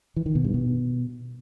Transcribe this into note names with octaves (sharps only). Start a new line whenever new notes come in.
E3
D#3
B2
G2
B2